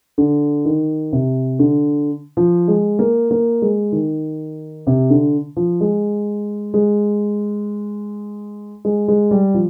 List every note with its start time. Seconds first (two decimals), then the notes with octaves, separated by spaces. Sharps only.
0.18 D3
0.65 D#3
1.12 C3
1.59 D3
2.37 F3
2.68 G#3
2.99 A#3
3.31 A#3
3.62 G#3
3.92 D#3
4.87 C3
5.10 D3
5.56 F3
5.80 G#3
6.74 G#3
8.85 G#3
9.08 G#3
9.31 G3
9.54 F3